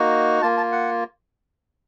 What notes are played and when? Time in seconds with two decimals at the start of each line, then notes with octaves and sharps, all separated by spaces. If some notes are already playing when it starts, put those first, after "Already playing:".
Already playing: A#3 D#4 F#4
0.42 A#3 F4 A5
0.57 A5
0.72 F#5